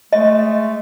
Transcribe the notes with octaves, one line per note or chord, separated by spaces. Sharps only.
G#3 A3 D#5